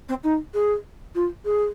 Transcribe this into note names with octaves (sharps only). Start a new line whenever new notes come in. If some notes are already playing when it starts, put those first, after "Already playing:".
C4
D#4
G#4
F4
G#4